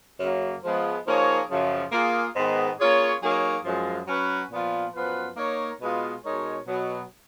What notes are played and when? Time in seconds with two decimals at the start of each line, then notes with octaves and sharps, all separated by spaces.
0.20 F#2 C#3 F#3 A#3
0.64 F3 G#3 B3
1.06 F3 A#3 D#4 G#4 C#5
1.50 F#2 C#3 F3
1.92 A#3 F4 G#4
2.36 G#2 D#3 G#3 B3
2.79 A#3 C#4 F4 G#4 C#5
3.22 F#3 A#3 D#4 G#4 C#5
3.65 F#2 F3 G#3
4.07 F#3 C#4 F#4 B4
4.51 A#2 F3 B3 F4
4.94 F#2 F3 B3 F4 B4
5.37 A#3 D#4 A#4 C#5
5.80 B2 G#3 B3 F4
6.23 B2 G#3 D#4 A#4 C#5
6.66 B2 F#3 B3